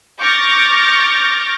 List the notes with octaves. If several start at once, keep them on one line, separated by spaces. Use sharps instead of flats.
C#6 D6 F6 G6 A6 A#6